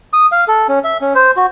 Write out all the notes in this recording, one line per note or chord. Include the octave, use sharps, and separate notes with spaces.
D#6
F5
A4
C#4
E5
C#4
C5
F#4